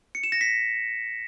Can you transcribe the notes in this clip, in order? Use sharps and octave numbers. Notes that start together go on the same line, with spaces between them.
C#7
E7
A#6
B6